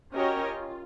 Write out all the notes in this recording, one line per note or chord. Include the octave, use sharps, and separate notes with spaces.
C#4 F#4 G4 A#4 C#5 D#5
F4